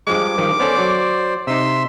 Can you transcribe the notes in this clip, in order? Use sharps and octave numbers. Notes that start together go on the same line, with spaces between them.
G2 F3 G#3 D6
G2 D#3 F3
B3 C#4 A4 C5 D5
F#3
C3 D#4 E5 C6 E6